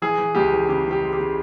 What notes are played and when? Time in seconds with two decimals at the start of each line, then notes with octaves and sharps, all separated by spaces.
0.02 E3 G#4
0.18 E3
0.35 C#2 G4
0.52 E3
0.69 C#3 G4
0.86 C#3 G4
1.03 G#3
1.13 G4
1.19 C#3